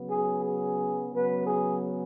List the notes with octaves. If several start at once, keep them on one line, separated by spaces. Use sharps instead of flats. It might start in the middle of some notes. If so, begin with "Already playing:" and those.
Already playing: C#3 F#3 B3
G#4
G#4
C#3 F#3 B3 B4
G#4